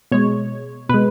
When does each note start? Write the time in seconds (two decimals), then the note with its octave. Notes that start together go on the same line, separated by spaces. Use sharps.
0.12 B2 G#3 C#5
0.89 B2 G#3 B4